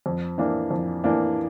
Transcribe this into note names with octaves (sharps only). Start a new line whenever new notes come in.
F2
E3 A#3 D4
F2
E3 A#3 D4